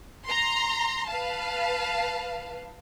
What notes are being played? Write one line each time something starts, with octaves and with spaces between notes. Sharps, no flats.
A#5 C6
B4 F5 A5